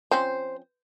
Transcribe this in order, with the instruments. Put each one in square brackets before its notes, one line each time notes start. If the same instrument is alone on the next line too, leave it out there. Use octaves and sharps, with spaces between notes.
[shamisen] F3 C4 C#4 [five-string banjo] C5